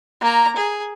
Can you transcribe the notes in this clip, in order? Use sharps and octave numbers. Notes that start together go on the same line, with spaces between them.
A#3 A#5
G#4